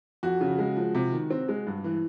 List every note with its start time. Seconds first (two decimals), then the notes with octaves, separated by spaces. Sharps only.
0.23 F2 F#4
0.41 C#3
0.59 G#3
0.76 F3
0.95 C3
1.12 D#3
1.30 C4
1.49 G#3
1.67 G2
1.84 E3